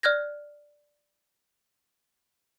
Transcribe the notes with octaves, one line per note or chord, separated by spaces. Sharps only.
D5 F6 F#6 G#6 A#6